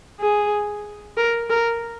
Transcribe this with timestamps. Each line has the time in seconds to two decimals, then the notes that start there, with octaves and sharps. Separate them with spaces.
0.20 G#4
1.17 A#4
1.50 A#4